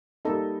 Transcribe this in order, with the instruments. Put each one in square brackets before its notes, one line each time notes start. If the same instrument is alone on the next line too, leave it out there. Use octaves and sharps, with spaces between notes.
[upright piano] G3 A#3 D#4 [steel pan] A4